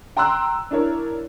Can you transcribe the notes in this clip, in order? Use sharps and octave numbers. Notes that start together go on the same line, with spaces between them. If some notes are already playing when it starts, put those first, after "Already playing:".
G5 A#5 C6 E6 F#6
D4 E4 A#4 C#5